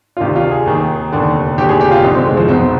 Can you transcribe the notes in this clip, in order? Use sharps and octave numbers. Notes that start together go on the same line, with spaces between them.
F4
D2 C3 D#3 G4
F4
G#4
D#2 D#3
F1 D#2 D3
F1 D#2 D3 G4
G#4
G4
F4
F1 F2 D3 D#4
C4
G#3
F3
B1 B2 C4